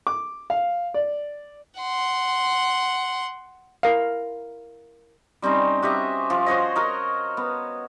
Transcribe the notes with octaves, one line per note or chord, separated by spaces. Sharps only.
D6
F5
D5
F#5 C6
E4 A#4 F5
G3 C4 C#4 D#4
F#4 G4 D#5 E5
F3
F#4 C5 C#5 D#5
F#4 A#4 D#5
B3